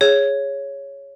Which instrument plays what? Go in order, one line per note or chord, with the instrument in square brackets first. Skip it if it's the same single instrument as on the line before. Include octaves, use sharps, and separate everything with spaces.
[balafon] G#4 [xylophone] C#5